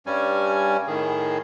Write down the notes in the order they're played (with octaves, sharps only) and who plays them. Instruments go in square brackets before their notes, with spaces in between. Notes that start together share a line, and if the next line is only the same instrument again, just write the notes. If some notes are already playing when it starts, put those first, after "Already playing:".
[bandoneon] G2 G3 C#4 G#5
A2 D#3 G#4